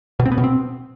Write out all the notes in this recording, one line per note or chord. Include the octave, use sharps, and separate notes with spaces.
B2
C4
B3
B2
C4